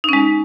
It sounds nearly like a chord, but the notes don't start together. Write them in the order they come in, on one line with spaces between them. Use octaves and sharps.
D#4 C#4 G#3